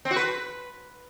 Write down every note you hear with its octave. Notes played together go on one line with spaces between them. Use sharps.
C4
F#4
B4